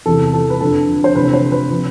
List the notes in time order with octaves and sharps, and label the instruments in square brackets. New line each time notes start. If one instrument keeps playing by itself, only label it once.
[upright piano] E2 C3 E3 A4
A4
B4
F2 D3 F3 A4
C5
D2 C3 E3 B4
C5
B4
C3 F3